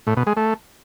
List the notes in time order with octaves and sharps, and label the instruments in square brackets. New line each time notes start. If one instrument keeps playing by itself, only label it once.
[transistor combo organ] A2
B2
G#3
A3